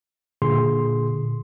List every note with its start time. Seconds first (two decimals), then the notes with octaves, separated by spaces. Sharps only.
0.42 A#2 D3 G#4 C6